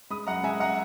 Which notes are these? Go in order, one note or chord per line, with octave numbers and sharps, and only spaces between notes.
G#3 B5 D#6
F#2 F#5 A#5
G#3 E5 G#5
F#5 A#5